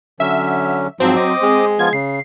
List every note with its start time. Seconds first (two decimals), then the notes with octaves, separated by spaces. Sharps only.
0.20 D3 F#3 C#4 E5
1.00 G#2 F3 F#3 C4
1.16 D#5 D6 D#6
1.42 G#3
1.79 F3 B3 F4 G#6
1.93 C#3 C7